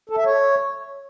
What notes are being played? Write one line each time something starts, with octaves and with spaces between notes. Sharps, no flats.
A4
E5
C#5